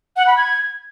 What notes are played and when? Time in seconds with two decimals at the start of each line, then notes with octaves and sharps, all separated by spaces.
0.16 F#5
0.27 B5
0.37 G#6